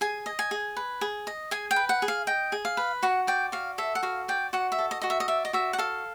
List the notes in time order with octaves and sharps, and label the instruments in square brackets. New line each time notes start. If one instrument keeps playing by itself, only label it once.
[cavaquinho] G#4 G#5
D#5
G#5
G#4
B4
G#4
D#5
G#4 G#5
G5
B4
F#5
G#4
F5
D#5 G5
G#4
F5
B4
F#4 F#5
D5 G5
F#4 F5
A4 E5
F#5
F#4 F5
D5 G5
F#4 F#5
E5
A4
D#5
F#4 D#5
E5
D#5
D5 E5
D#5
F#4 E5
F#5
A4 F5